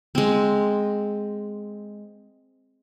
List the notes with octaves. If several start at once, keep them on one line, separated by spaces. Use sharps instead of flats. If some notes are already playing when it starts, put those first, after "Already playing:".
G#3 C4